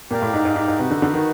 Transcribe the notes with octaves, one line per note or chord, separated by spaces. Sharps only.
A#2 G4 A#4 D5 F5
A2
G#2
G#2
G#2
G#2
C3 D#4 F#4 B4
D3
D3
D#3